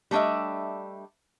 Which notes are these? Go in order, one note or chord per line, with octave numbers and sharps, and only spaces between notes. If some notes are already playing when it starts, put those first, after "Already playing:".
G3 A3 D4 D#5 E5